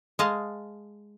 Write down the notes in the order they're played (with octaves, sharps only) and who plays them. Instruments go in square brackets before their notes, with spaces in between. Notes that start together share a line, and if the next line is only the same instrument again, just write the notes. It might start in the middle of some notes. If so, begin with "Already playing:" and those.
[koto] G#3 D#5 F5 A5